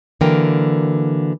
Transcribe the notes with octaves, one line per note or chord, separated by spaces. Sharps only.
D3 E3 F#3 A#3 A#4 G5